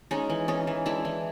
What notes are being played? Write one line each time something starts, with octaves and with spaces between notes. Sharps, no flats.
G#3 C#4 D#4
E3
E3 C#4 D#4
E3
G#3 D4 E4
E3